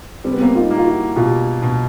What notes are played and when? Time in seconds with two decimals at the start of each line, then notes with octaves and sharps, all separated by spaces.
0.24 G3 C4
0.33 B3
0.41 A#3 C4
0.55 D#4 F4
0.71 A#3
0.78 F4
0.85 E4 F#4
1.16 B2 F4 G4
1.63 B2